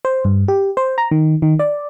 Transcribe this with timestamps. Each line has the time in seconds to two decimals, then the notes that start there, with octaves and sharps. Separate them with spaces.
0.05 C5
0.25 G2
0.48 G4
0.77 C5
0.98 A#5
1.11 D#3
1.42 D#3
1.59 D5